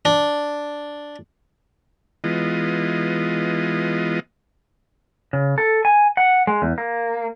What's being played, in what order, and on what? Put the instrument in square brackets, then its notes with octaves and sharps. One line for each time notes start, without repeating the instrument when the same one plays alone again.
[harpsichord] D4
[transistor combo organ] E3 G#3 B3 F4 D#5
[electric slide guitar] C#3
A4
G#5
F#5
G#3
E2
A#3